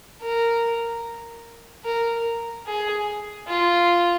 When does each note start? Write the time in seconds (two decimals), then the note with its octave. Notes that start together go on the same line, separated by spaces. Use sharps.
0.22 A#4
1.85 A#4
2.66 G#4
3.47 F4